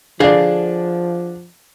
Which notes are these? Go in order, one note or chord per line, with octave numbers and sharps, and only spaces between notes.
D3 F3 D4 G#4 F5